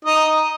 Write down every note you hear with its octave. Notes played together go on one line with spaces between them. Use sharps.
D#4 D#5